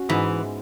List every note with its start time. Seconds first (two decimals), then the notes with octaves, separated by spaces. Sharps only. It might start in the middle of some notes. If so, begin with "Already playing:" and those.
Already playing: C#4 F#4
0.09 G#2 E3 G#3 B3